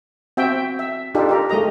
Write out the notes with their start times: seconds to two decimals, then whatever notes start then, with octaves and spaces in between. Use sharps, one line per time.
0.37 C4 F#4 E5 G5
0.79 E5
1.15 D4 D#4 F4 G4 A4
1.29 G4 A#4
1.50 G#3 A3 G4 D#5 A#5